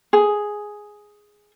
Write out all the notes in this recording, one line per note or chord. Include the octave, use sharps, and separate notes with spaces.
G#4